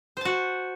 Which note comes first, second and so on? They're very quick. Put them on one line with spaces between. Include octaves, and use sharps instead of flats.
C5 A5 F#4